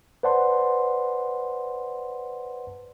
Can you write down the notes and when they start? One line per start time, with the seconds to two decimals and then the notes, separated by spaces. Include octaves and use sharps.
0.23 B4 C5 D5 F#5 A5 C6